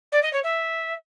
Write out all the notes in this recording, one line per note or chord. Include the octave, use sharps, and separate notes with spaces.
D5
D#5
C#5
E5